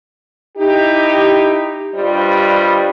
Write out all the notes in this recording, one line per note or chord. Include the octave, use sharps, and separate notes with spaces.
D#4 E4 G4
G2 G3 F4 C5 D#5